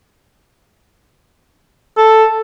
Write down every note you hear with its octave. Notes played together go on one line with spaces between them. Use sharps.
A4